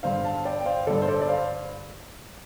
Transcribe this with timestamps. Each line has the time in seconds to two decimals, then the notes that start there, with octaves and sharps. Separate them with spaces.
0.03 G2 D3 C5 F5
0.24 F5 A5
0.45 D5 G5
0.61 G5
0.66 C5 F5
0.87 G2 D3 A4 D5
1.02 C5
1.08 A4 D5
1.21 D5
1.29 C5 F5